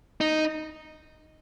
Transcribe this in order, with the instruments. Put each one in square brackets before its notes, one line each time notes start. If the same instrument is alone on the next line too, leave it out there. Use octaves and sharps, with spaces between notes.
[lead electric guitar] D#4